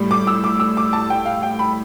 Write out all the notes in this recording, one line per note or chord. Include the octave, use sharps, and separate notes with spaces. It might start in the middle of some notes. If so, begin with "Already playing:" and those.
Already playing: A2 G3
D6
E6
D6
E6
D6
A5
G5
F5
G5
B5